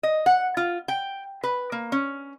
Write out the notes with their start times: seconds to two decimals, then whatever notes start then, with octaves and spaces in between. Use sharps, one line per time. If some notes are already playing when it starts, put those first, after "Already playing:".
0.03 D#5
0.26 F#5
0.57 F4
0.88 G5
1.44 B4
1.72 A#3
1.92 C#4